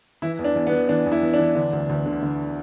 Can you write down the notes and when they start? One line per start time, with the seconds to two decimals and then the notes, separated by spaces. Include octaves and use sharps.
0.22 E3 E4
0.39 E2
0.45 D4
0.55 E2
0.67 B3
0.72 E3
0.89 E3 D4
1.06 E2
1.12 E4
1.23 E2
1.34 D4
1.39 E3
1.55 D3
1.73 D2
1.89 D2
2.06 D3
2.22 D3